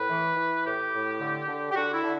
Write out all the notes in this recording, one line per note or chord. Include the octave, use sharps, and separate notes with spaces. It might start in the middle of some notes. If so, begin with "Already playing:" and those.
Already playing: A2 B4
E3
E3
A2 G4
A2
D3
D3
G4
D3 F#4
E4
D3